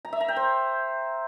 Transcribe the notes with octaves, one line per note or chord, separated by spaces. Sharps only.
A#5
E5
A#5
G5
C5